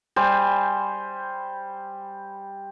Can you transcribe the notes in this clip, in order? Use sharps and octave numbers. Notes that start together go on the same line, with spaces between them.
G3 C5 G#5